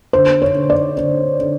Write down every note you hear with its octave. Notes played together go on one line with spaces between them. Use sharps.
D3 C5
C#5
D3
D5
D3 D5
D3